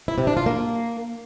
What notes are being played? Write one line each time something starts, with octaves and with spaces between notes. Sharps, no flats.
E4
C3
D4
F4
A#3